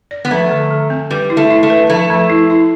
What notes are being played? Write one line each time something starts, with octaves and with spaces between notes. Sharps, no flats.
D5
B3
F3 A3
D3
D3
C4
G3 B4
E4
A3
E4
A3
B4
F3 A3
F3
E4
E4